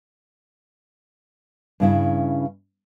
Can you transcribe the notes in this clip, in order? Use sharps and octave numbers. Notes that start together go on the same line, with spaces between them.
G2 C#3 E4